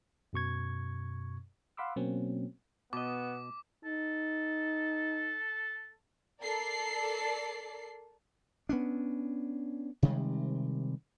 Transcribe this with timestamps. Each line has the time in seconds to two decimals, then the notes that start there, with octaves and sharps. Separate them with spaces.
0.33 F#2 B2 C#6 G#6
1.77 F5 F#5 B5 C6 D6 E6
1.96 B2 F#3 A#3 C4 C#4
2.93 B2 B3 D#5 D6
3.84 D#4 A4
6.42 A4 A#4 D5 C7
8.69 B3 C#4 D4
10.03 C3 D#3 G3 G#3